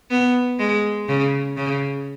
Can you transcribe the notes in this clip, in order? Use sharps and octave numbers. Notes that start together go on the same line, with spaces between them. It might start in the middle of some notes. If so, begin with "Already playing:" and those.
B3
G#3
C#3
C#3